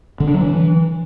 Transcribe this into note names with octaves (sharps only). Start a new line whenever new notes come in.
D3
D4
F#3
E3